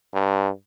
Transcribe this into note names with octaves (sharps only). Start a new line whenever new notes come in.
G2